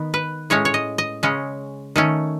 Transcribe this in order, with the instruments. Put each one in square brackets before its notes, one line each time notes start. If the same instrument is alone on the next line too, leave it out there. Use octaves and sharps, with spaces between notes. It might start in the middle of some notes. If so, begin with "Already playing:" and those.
Already playing: [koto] D#3 B3
B4
A2 G#3 C#4 C#5
C#5
D#5
D#5
C#3 G#3 C#4
D#3 A3 C#4